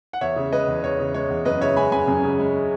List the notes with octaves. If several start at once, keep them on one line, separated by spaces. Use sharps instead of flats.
F#5
E2 C#5 E5
C#3
G#3 B4 D#5
E2
E2 C#5
C#3
G#3 C#5
E2
F#2 B4 D#5
C#3 C#5 E5
G#3 G#5 B5
F#2 G#5 B5
F#2
C#3
G#3